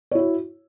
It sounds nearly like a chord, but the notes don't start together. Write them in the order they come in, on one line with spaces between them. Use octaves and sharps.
C#5 E4 F#4